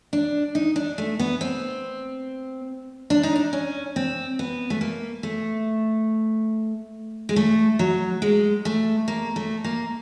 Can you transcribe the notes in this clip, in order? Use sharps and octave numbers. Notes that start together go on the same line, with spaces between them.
D4
D#4
D4
A3
B3
C4
D4
D#4
D4
C#4
C4
B3
A3
A#3
A3
G#3
A3
F#3
G#3
A3
A#3
A3
A#3